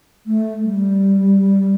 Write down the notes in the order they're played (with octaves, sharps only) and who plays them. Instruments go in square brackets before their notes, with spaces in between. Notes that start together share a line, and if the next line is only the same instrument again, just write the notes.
[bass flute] A3
G3